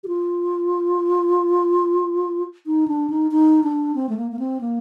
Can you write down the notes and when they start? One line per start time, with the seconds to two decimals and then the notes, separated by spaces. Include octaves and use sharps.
0.04 G4
0.08 F4
2.66 D#4
2.88 D4
3.10 D#4
3.31 D#4
3.64 D4
3.95 C4
4.09 A3
4.17 A#3
4.32 A#3
4.39 C4
4.61 A#3